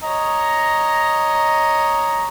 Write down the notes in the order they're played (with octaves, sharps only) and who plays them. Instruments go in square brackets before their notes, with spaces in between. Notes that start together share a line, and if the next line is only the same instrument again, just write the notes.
[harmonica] C#5 D#5 A#5